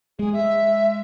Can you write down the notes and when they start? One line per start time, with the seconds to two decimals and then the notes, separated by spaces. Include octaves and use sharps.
0.19 G#3 G#4
0.33 E5